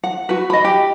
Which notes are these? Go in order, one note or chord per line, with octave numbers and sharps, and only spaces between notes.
F#5
F#4 B4
D#5 B5
G4